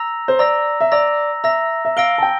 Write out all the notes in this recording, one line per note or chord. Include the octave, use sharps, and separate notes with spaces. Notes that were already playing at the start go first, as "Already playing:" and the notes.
Already playing: A#5 E6 A#6
C5
D5 A#5 E6 A#6
E5
D5 A#5 E6 A#6
E5 A#5 E6 A#6
E5
F5 E6 A#6 D7 G7
A5
G5